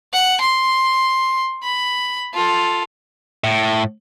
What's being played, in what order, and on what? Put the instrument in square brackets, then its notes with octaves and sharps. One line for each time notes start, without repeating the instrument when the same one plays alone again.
[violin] F#5
C6
B5
F4 A4
[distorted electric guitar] A2